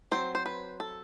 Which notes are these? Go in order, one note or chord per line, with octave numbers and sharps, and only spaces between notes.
F#3 C4 C5
C5
B4
A4